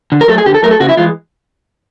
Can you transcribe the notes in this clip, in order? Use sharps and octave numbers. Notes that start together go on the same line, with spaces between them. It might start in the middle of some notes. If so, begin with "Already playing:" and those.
D3
A#4
F#3 A3 A4
G#4
D3 G4
A4
F#3 A3 A#4
A4
C#3 F#4
E4
E3 G#3 F4